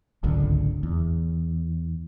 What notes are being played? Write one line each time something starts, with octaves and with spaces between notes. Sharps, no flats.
D1 G#1 C#2 D3
E2